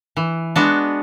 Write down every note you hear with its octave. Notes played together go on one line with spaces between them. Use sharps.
E3
G#3 B3 D4 F#4